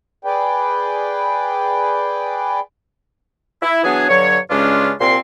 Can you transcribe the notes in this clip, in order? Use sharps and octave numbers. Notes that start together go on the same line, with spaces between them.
G#4 B4 D5 G5
E4
E3 F#3 B3 D4 G#4
G2 D3 F#3 C#5
G2 C#3 G#3 C#4 D4 F4
C2 A#2 C4 C6